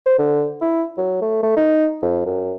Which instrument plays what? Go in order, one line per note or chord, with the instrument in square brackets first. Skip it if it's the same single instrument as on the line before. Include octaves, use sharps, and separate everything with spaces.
[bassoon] C5
D3
E4
F#3
A3
A3
D#4
F2
F#2